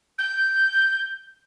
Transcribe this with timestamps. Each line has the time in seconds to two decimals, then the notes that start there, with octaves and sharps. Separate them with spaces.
0.18 G6